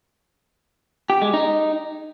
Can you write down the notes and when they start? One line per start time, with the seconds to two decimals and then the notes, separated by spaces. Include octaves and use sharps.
1.10 G4
1.22 G#3
1.34 D#4